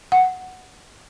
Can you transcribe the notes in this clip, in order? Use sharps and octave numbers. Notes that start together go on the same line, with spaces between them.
F#5